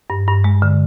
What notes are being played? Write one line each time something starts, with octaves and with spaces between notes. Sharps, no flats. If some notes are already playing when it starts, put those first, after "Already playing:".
G2
G2
G#3
D3